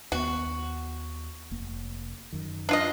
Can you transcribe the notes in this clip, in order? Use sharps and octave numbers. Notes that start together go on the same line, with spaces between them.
D#2 B3 F#4
F1 A#3
F#2 D#3
D4 F4 D#5